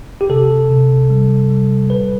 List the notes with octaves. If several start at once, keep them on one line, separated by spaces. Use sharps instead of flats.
G4
C3 A4
C3
G3
G3
A2 B4